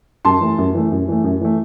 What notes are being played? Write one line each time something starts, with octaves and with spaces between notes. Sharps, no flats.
F#2 A5 C6
E3 A3
F#2
E3 A3
F#2
E3 A3
F#2
E3 A3